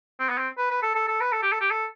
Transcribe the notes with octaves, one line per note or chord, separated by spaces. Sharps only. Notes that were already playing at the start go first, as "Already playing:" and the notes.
C4
B3
C4
B4
B4
A4
A4
A4
B4
A4
G4
A4
G4
A4